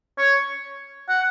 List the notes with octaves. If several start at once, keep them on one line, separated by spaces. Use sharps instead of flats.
C#5
F#5